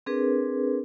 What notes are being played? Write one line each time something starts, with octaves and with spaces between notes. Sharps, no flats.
C4 D4 G#4 A#4 B4